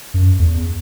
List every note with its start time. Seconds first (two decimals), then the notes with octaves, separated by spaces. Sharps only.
0.14 F#2
0.39 E2